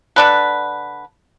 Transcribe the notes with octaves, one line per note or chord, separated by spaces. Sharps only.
D3 D4 B4